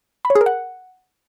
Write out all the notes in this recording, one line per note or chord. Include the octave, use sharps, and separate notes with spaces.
B5
C#5
G#4
A#4
F#5